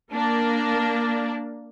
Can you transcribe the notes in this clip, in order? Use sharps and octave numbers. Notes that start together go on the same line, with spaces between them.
A#3 D4